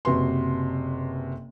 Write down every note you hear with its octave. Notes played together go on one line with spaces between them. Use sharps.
F#1 C3 F#4 B4 C6